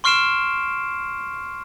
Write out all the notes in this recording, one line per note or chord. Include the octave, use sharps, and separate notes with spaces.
C6 C#6 F6 C7 D7 E7